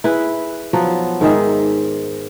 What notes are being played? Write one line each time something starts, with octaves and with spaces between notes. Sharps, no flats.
E4 G#4 B4
F3 F#3 B3
G#2 D#3 G#4 E5